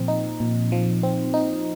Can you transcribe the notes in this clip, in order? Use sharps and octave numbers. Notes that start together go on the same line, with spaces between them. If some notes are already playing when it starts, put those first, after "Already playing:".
Already playing: A#2 F3 C4
D#4
A#2
F3
C4
D#4